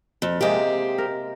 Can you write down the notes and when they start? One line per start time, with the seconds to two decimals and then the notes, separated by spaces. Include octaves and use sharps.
0.22 F2
0.41 C3 G#3 A#3 C4 G4
0.98 A#4